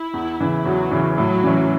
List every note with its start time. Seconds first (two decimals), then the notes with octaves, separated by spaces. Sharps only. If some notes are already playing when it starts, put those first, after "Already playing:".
Already playing: E4
0.14 E2
0.41 C#3 E3
0.65 E2 F#3
0.91 C#3 E3
1.18 A2 F#3
1.44 E3 C#4